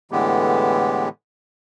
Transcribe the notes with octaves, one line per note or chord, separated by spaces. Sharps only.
A2 D3 E3 G#3 B3 G4